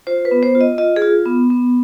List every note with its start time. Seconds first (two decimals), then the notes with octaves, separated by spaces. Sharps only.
0.07 F4 C5
0.25 B4
0.31 B3
0.43 C5
0.55 F4
0.61 D#5
0.78 F4 D#5
0.96 G#4
1.02 F4
1.25 B3
1.50 B3